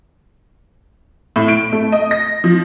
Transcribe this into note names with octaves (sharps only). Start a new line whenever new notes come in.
A2
D7
A3
D#5
A#6
F3